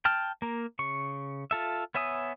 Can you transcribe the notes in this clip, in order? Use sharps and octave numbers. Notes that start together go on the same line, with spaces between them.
G5 A5 F6
A#3 A#4
C#3 C#6
F4 A4 E5
B3 C#5 E5 G#5 D#6